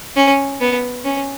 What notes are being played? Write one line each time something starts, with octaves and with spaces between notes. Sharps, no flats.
C#4
B3
C#4